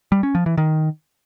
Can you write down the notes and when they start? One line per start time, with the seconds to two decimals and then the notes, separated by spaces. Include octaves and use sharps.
0.12 G3
0.23 C#4
0.35 F3
0.46 E3
0.57 D#3